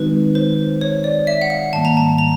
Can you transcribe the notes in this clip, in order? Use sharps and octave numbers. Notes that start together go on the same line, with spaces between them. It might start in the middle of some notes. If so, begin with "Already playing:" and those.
Already playing: D#3 G#3 C4 D#4 F#4 B4
C5
C#5
D5
E5
F#5
F5
G#2 D#3 G3 A#3 A5
A#5
A5
A#5